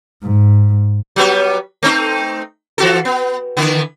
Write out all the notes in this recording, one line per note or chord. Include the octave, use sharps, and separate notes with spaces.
G#2
F#3 G3 B3
A3 C4 D#4
E3 F#4 A4
B3
D3 E3 B3